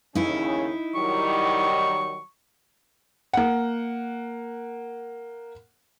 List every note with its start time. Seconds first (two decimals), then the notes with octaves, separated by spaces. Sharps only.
0.15 D#2 C#3 C#4 D#4 E4
0.95 D#3 F#3 G3 C#6
3.33 A#3 F#5